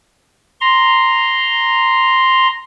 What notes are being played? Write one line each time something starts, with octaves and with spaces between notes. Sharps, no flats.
A#5 C6